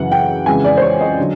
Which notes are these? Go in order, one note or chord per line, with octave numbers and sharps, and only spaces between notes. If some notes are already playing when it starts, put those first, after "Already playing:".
Already playing: F#2 C#3 E3 F#5
G5
F2 C#3 E3 G#3 G#5
D5
C5
C#5
D#5
D3 F#3